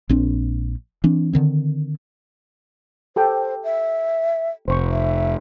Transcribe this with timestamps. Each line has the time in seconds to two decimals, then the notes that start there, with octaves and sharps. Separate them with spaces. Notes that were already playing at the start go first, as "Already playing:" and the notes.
0.09 A#1 C4 D4
1.04 E3 C4 D4
1.33 D3 D#3 C4
3.16 G4 A4 C5 G5
3.64 E5
4.68 F1 C5 C#6
4.92 E5